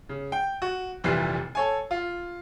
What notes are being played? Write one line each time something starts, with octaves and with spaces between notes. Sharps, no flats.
C#3
G5
F#4
F1 A#2 E3 G3 B4 C7
A4 C#5 G#5
F4